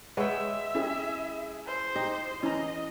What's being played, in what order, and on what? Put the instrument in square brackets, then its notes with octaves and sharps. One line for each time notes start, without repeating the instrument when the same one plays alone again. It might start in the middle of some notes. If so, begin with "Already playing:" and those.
[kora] G#3 G5 [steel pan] B4 C#5 F#5 [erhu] E5
[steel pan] C#4 G4 [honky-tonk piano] E4 G#4
[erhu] C5
[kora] D#4 [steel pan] G4
[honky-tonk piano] E3 [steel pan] C#4 A#5 [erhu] D#5